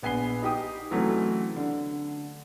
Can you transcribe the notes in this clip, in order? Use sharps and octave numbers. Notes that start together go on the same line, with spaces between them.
A#1 B3 G#5 B5 C7 G7
D#4 G4 D#6
C3 E3 F#3 A3 C#4
D3